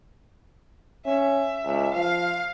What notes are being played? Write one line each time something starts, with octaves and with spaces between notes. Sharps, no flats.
C#4 E5
C#2
F3 F5